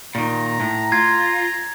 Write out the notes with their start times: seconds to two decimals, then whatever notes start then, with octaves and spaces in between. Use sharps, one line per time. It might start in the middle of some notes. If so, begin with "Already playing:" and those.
0.15 A#2 D#3 A#5
0.60 A2
0.92 F4 G#6